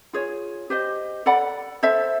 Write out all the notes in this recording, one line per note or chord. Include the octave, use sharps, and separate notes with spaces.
F4 G#4 C#5
G4 C5 D#5
A4 D5 F#5 B5
A4 C5 E5